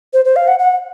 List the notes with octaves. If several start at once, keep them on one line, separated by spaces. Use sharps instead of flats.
C5
C5
F5
F#5
F#5